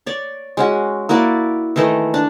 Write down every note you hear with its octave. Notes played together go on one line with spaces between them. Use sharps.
C#5 D5
G#3 C#4 F#4
A#3 E4 F#4 D5
D#3 E3 A3 D#5
D4